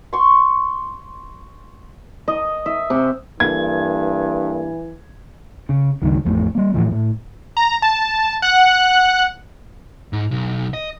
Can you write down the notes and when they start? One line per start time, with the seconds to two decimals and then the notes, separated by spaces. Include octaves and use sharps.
0.13 C6 C#6
2.28 D#5
2.66 E5
2.90 C3
3.40 G2 E3 A#3 A4 G#6
5.69 C#3
6.02 C#2 G2 D#3
6.25 A1 F2 A2
6.55 G3 A#3
6.74 A2 E3 F3
6.92 A2
7.57 A#5
7.82 A5
8.42 F#5 F#6
10.13 G#2
10.31 B1
10.73 D#5